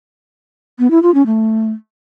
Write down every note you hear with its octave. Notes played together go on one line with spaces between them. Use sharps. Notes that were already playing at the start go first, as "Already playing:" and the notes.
B3
E4
F4
C#4
A3